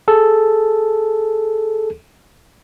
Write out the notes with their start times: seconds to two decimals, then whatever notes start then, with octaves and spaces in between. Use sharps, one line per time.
0.08 G#4 A4